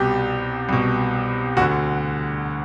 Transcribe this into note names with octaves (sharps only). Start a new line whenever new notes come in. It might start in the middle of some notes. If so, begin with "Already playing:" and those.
Already playing: C2 B2 G4
C2 B2
D2 D3 F#4